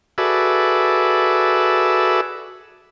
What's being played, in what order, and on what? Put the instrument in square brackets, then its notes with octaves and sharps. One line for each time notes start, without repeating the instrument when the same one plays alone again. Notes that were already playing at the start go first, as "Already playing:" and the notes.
[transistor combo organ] F#4 G#4 A4 B4 D5 E5